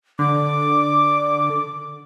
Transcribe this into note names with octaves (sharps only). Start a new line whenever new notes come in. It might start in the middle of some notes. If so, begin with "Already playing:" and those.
D3 D6